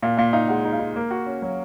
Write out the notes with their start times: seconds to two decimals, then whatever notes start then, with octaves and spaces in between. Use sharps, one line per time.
0.03 A#2 F5
0.17 A#2 F5
0.33 D#4 F5
0.48 G#3 F#5
0.65 D#4
0.73 F5
0.79 D#4
0.96 A#3
1.11 F#4
1.26 C#4
1.42 F#3